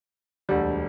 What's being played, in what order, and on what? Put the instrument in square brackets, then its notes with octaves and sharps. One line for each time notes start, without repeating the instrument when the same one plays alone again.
[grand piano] E1 D2 D3 [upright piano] G3